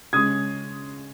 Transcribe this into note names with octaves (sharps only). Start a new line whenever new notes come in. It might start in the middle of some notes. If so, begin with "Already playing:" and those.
C#3 G#3 C#4 D#6 G#6